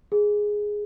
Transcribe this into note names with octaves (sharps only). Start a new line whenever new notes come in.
G#4